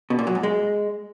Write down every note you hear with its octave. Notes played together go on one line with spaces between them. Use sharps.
B2
A#2
F#3
G#2
G#3